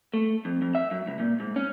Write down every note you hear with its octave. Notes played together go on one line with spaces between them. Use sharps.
A3
F2
F2
E5
F#2
C#2
A#2
G#2
C#4